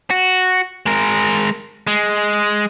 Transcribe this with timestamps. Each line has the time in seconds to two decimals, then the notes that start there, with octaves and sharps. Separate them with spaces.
0.10 F#4
0.86 G#3 A#4
1.87 G#3